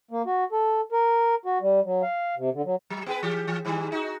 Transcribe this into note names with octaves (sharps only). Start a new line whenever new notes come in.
A#3
F#4
A4
A#4
F#4
G3
F#3
F5
C3
D3
F#3
F#3
B3 G#4 B4
E3 G4
E3
G#2 D#3 G3
D#4 F#4